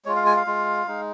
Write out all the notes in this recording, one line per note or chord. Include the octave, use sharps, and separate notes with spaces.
G#3 F4 C#5
F5
G#5
F5
G#3 F4
G#3 D#4